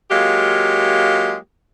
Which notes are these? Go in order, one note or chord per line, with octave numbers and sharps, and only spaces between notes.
F#3 G#3 A#3 F4 G4